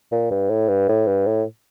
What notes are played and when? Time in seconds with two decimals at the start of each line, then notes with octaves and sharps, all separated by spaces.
0.12 A#2
0.31 G2
0.50 A2
0.68 G2
0.89 A2
1.07 G2
1.26 A2